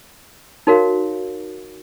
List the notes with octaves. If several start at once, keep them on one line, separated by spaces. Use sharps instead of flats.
D#4 F#4 A#4 C#5 F5